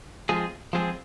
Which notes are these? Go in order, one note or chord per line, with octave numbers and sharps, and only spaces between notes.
F3 G#3 C4 F4 G#4
F3 G#3 C4 F4 G#4